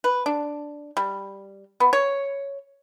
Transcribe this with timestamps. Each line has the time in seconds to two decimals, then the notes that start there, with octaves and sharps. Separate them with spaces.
0.04 B4
0.26 D4
0.97 G3
1.80 B3
1.93 C#5